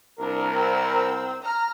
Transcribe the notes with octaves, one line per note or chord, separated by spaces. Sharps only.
C2 D4 A#4
C4 E6
A#5 F6